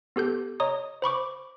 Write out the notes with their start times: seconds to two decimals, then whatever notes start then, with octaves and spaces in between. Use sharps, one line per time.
0.16 B3 G4 A4 G6
0.60 C#5 D#5 A#5 D#6
1.02 C5 B5 C#6 D6